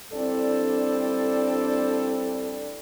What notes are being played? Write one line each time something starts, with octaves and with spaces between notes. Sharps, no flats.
G2 C4 D4 E4 A4 D5